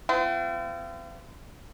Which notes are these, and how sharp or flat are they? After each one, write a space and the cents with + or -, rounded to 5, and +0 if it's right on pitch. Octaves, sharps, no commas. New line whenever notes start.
C4 -40 F4 -45